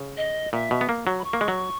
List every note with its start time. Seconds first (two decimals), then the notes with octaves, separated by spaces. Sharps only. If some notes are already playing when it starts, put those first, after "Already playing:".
Already playing: C#3
0.17 D#5
0.53 A#2 E5
0.71 B2
0.81 B3
0.89 A#3
1.07 F#3
1.19 B5
1.24 C#6
1.33 A#3
1.41 G#3
1.48 F#3